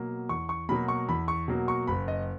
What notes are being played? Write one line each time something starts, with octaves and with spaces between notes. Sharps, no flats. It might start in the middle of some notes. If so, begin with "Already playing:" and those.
Already playing: B2 F#3 A#3
E2 C#6
C#6
B2 F#3 A#3 B5
C#6
E2 B5
C#6
B2 F#3 A#3
C#6
F#1 B5
D#5